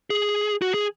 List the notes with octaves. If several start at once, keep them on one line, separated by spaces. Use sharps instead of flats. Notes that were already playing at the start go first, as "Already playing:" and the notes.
G#4
F#4
G#4